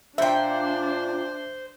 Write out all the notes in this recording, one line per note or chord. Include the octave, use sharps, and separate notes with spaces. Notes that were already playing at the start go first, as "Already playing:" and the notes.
A#2 D4 C5 E5 G5